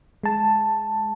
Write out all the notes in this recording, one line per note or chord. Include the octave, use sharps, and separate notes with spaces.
G#3 A5